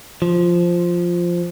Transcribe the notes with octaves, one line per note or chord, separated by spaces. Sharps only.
F3